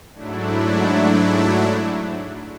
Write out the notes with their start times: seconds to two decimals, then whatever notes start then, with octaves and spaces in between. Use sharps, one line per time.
0.14 G#2 F#3 A3 D4 E4